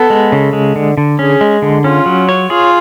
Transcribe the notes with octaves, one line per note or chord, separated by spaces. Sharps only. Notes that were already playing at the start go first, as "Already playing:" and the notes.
Already playing: B3 A4
G#3
C#3
G#3
D3
D3
C#4 G#4
G#3
D3
C#4 F4
F#3
C#5
F4 G#4